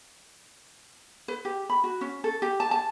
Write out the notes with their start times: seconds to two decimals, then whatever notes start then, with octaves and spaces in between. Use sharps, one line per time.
1.28 B4
1.45 G4
1.70 B5
1.84 F#4
2.01 C#4
2.24 A4
2.42 G4
2.60 A5
2.71 A5